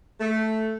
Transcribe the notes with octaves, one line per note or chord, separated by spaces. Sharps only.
A3